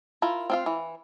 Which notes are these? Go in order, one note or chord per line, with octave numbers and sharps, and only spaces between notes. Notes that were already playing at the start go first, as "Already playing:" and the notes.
E4 F4 A#4
C4 F4 F5
E3